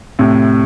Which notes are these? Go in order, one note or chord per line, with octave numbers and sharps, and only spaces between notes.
A2 C3